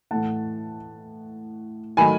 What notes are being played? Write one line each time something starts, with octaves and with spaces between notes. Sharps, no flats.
A2 E3 A3 F#5 A5
D#3 F#3 A3 G#5 B5